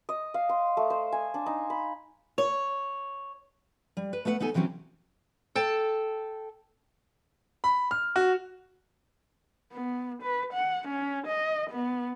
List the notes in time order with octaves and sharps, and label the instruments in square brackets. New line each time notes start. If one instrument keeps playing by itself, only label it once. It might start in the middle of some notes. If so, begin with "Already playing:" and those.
[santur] D#5
F5
C6
A3
C5
G#5
D4
D#4
B5
[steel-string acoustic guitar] C#5
G3
B4
A3 B3 B4 E5 F#5
D#2 B3 D#4 A4 G#5
C3 E3 F#3 C4 C#4
A4 G5 A5
[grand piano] B5
F6
F#4
[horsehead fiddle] B3
B4
F#5
C#4
D#5
B3